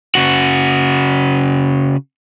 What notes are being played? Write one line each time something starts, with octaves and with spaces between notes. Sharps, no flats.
C#3 F#4